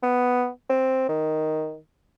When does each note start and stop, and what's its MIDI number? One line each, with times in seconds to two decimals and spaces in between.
0.03 0.49 59
0.69 1.07 60
1.09 1.77 51